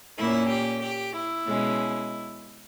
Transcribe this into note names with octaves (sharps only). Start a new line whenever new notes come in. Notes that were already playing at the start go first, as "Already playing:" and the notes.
A#2 A#3 C#4 E4
G4
G4
E4
B2 G#3 C#4